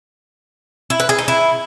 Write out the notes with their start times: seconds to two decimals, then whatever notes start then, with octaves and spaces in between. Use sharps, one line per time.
0.90 E4
1.00 B4
1.09 G#4
1.18 D#4
1.28 E4